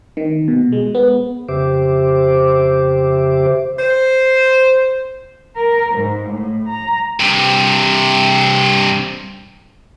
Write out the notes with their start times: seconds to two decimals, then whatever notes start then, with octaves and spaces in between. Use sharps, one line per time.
0.17 D#3
0.48 B2
0.72 G#3
0.95 B3
1.49 F2 C#3 G4 C5 E5 D6
3.78 C5
5.56 A#4
5.94 G#2
6.29 A2
6.67 A#5
7.20 G2 C3